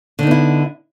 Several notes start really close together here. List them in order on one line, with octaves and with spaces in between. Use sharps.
D3 D#4 B3 E4